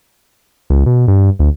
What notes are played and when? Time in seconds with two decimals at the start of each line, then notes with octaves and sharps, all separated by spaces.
0.70 C#2
0.86 B2
1.08 G2
1.39 D2